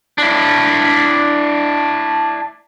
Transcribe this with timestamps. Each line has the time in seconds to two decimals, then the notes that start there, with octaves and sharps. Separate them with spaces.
0.18 D4 E4